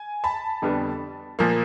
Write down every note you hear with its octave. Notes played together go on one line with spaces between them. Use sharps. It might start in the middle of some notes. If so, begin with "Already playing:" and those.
Already playing: G#5
A5 B5
F2 D3 G3 B3 D4
A#2 F3 A#3